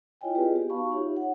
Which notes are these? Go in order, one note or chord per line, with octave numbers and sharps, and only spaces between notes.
E4 F4 C#5 D#5 G5 G#5
C4 F4 G4 G#4 B4 D5
B3 G4
D#4 F#4 F5 A5 B5 C#6
D#4 F4 G4 C#5 E5
C#5 F#5